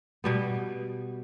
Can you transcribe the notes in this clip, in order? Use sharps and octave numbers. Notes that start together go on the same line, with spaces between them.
B2 G3 B3